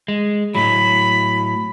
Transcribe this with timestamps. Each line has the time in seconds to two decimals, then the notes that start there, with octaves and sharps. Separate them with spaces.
0.08 G#3
0.55 A2 F#3 B5